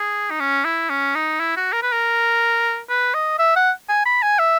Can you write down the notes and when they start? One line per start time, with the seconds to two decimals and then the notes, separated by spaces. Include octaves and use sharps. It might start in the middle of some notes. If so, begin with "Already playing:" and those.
Already playing: G#4
0.31 D#4
0.40 C#4
0.65 E4
0.90 C#4
1.15 D#4
1.40 E4
1.57 F#4
1.73 A#4
1.83 B4
1.92 A#4
2.90 B4
3.14 D#5
3.39 E5
3.56 F#5
3.89 G#5
4.06 B5
4.22 G#5
4.39 E5